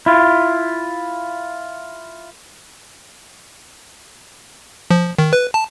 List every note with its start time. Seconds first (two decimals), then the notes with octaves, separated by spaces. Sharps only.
0.06 E4 F4
4.91 F3
5.19 D#3
5.33 B4
5.54 A5